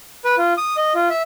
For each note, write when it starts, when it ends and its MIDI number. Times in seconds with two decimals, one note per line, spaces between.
0.25 0.35 71
0.38 0.53 65
0.58 0.76 87
0.77 0.93 75
0.95 1.08 65
1.10 1.22 76